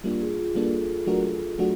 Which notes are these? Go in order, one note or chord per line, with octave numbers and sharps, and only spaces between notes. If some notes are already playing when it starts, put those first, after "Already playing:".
G3 A#3 D4 F4
G#4
F4
G3 A#3 D4 A4
F#3 A3 D4 F#4 A#4
F#3 A3 D4 F#4